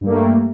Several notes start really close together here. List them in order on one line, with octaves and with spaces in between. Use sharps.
G2 G3 A#3 A3